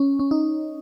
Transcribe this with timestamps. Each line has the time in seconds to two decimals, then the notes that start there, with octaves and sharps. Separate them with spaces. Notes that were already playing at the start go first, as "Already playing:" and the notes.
Already playing: C#4
0.19 C#4
0.31 D#4